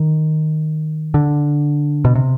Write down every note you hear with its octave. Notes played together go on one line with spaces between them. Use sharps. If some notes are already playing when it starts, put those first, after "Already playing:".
Already playing: D#3
D3
B2
C3